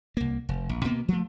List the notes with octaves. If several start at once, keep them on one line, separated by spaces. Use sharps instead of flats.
C2 A#3
F1
A#1
B2 A#3 B3
F3 A3